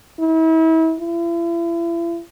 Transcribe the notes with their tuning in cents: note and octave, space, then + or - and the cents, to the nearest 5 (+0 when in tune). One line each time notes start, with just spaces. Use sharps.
E4 -35
E4 +40